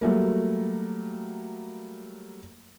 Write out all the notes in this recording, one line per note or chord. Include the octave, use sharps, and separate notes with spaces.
F#3 G3 A3 A#3